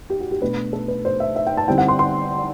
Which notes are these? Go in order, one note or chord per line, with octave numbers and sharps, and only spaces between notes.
G4
F#4
G4
B2 A3 D4 B4
A4
B4
C5
E5
E5
G5
A5
D3 G3 C4 E4 G5
F#5
C6
C6